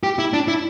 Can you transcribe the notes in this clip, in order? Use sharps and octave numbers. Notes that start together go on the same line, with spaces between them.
G4
E4
D4
E4